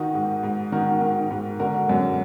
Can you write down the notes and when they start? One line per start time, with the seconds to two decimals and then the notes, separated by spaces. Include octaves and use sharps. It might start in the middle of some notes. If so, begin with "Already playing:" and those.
Already playing: D#3 D#4 F#4
0.14 G#2
0.43 G#2
0.72 D#3 F#4 A#4
1.01 D#3
1.31 G#2
1.59 D3 F#4 A#4
1.89 F#2